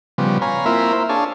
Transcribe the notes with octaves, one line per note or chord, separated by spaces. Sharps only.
C#3 F3 G3 B3
C#5 F5 G#5 A#5 B5
A#3 C4 E4 F4 A#4 E5
C5 E5
D4 G#4 C#5 F5 A5